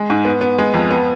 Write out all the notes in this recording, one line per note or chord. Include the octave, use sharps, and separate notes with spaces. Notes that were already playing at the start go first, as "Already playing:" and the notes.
Already playing: G#3
G#2
B3
B3
G#3
F2
B3